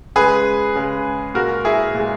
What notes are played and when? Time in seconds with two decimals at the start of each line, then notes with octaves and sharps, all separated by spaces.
0.16 C#3 G#3 G#4 B4
0.75 C#3 G#3
1.34 A#2 G#3 F#4 A#4
1.65 E4 G#4
1.94 A#2
1.99 G#3